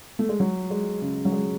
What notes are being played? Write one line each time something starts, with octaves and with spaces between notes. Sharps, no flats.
A3
G#3
F#3
G#3
C#3
F#3
G#3